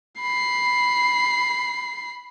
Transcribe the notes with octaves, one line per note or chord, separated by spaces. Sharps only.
B5 C7